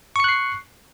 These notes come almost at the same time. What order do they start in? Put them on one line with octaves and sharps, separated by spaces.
C#6 C#7 F#6 C7